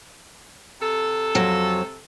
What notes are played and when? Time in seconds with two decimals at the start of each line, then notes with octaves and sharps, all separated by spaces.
0.81 C3 A4
1.35 F2 F#3